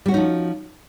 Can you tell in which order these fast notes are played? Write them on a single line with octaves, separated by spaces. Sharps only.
G3 F#4 C#4 D#4 F3